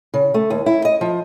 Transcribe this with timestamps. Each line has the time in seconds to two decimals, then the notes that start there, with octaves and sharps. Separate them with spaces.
0.14 C#3
0.34 A3
0.50 D#2
0.66 E4
0.85 D#5
1.01 F3